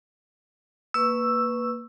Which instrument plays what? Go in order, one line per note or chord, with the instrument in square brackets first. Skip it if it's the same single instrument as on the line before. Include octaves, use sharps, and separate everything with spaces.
[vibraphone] A#3 B4 C#6 [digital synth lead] E6